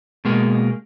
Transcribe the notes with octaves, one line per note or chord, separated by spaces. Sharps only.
B2 G#3 A#3